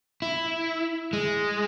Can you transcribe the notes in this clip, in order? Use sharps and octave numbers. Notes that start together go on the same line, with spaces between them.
E4
G#3